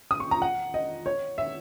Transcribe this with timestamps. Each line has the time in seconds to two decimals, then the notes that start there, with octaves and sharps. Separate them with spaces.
0.11 D#6
0.20 C#6
0.31 A#5
0.42 F#5
0.74 D#5
1.06 C#5
1.38 E5